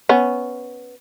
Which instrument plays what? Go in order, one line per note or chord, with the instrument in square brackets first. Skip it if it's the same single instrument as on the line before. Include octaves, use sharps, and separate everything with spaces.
[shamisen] B3 C#4